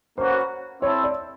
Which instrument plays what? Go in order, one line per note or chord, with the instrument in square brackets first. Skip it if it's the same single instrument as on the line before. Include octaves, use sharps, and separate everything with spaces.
[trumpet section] A#3 C#4 F#4 B4 [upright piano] C5
[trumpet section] C4 E4 A4 [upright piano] C#5
[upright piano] D5